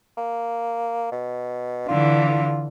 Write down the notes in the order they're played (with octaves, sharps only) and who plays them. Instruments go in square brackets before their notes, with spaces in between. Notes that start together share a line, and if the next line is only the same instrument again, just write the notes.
[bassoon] A#3
B2
[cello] D3 E3 [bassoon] F4